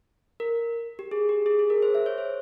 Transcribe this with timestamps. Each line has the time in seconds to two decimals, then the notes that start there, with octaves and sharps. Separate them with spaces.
0.40 A#4
0.99 G4
1.11 G#4
1.29 G4
1.46 G#4
1.59 G#4
1.70 A#4
1.82 C5
1.95 E5
2.06 C#5
2.18 C5